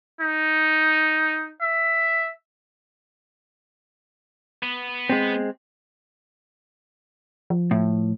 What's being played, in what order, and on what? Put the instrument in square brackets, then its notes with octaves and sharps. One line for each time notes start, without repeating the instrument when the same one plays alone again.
[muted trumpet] D#4
E5
[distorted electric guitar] B3
[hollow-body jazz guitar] G#3 C4
[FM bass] F3
[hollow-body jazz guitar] A2